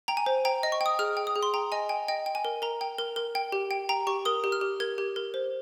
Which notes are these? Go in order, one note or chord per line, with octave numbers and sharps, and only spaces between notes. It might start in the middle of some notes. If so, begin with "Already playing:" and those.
G5 A#5
G#5
C5
G5 A#5
D#5
C#6
G5
D#6
G#4 F6
G5
D#6
G#4
C6
G5 A#5
D#5 G#5
G5 G#5
D#5 G5
G5
G#5
A#4
A#4 A#5
G5
A#4
A#4
G5
G4
G5
G5 A#5
G4 C#6
A#4 D#6
G4
F6
G4
A#4 G#6
G4
A#4
C5